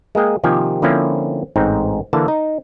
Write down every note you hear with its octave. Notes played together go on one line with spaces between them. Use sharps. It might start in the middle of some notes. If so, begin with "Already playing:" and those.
G#3 A#3 G#4 G5
C3 D#3 F3 A#3 G4 G#5
D3 F3 A#3 C4 C#4 E4
A1 G#2 C4 D#4
D3 E3 A#3 A5
D#4